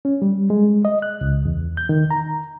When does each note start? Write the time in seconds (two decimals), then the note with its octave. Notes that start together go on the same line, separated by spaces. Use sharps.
0.05 C#4
0.22 G3
0.50 G#3
0.85 D#5
1.02 F#6
1.21 C#2
1.45 E2
1.77 G6
1.89 D#3
2.11 A#5